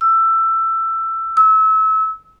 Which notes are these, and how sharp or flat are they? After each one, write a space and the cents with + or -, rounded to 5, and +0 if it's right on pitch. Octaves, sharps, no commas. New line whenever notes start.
E6 +15
E6 -30